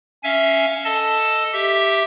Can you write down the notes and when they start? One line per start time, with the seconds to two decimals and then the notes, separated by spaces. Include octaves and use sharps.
0.24 C#4 E5 F5 G#5
0.84 A4 D#5 A5
1.53 G4 E5